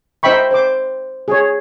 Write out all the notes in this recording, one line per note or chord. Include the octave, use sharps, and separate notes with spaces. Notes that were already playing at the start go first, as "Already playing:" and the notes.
D#4 C5 E5 G5 B5 C#6
C5 D6
G#4 C#5